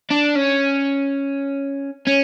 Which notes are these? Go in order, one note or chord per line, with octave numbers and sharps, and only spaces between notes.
D4
C#4
C#4